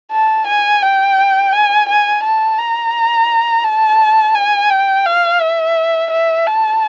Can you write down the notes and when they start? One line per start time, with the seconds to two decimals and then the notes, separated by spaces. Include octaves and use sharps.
0.11 A5
0.47 G#5
0.82 G5
1.52 G#5
1.89 G#5
2.23 A5
2.58 A#5
3.64 A5
4.35 G#5
4.70 G5
5.06 F5
5.41 E5
6.11 E5
6.47 A5